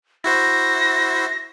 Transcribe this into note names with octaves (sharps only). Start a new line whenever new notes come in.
E4 F#4 C5 A#6